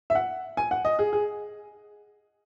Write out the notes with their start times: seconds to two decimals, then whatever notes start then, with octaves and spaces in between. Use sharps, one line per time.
0.10 E5
0.15 F#5
0.57 G#5
0.71 F#5
0.85 D#5
0.99 G#4
1.13 G#4